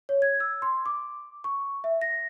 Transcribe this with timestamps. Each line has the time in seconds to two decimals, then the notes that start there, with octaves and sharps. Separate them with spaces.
0.09 C#5
0.22 G#6
0.40 E6
0.62 C6
0.86 D6
1.44 C#6
1.84 E5
2.02 A#6